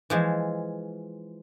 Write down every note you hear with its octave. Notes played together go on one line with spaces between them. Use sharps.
E3 F3 G#3